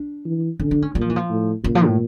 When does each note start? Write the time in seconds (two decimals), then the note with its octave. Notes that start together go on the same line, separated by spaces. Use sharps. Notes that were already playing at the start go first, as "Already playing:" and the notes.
Already playing: D4
0.25 E3
0.60 D3 C#4
0.71 D4
0.82 C#4
0.95 A#2 G3
1.01 F3
1.09 E3
1.16 F3
1.29 A2
1.64 A#2 C#3
1.75 F3
1.86 A2